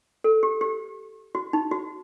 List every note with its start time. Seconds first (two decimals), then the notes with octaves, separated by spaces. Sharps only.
0.24 A4
0.43 G4
0.61 G4
1.35 F#4
1.53 D#4
1.71 F#4